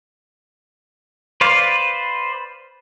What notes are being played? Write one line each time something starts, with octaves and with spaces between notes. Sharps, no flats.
B4 C5 D5 F5